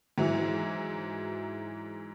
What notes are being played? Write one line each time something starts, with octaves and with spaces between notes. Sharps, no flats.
G#2 E3 F#3